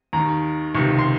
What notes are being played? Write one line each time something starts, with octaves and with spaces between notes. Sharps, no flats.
D#2 D#3 A#5
C#2 C3 D#3 C#6
C6